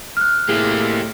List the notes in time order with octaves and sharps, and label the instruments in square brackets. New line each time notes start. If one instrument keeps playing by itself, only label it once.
[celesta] F6 F#6
[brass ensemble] A2 C3 E4 [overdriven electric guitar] A#3 G4 [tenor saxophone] G#4